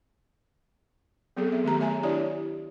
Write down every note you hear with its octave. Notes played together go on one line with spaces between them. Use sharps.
F#3 B3 C4 G#4 A4
G#4 E5
D#3 A3 G4 A#5
C#5 E5 G#5 A#5
D4 E4 G4 C#5 D5